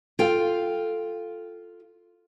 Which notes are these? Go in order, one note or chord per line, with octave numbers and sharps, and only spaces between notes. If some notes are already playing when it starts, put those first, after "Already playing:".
F4 A4 F5 G5